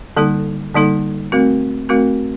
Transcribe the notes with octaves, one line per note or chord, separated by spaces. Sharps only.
D3 G3 A#3 D#4 A4
D3 G3 A#3 D#4 A4
A3 C4 F#4 A#4
A3 C4 F#4 A#4